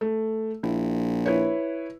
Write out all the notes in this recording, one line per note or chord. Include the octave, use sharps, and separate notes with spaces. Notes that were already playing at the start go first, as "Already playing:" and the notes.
A3
A#1 E4
E4 B4 C#5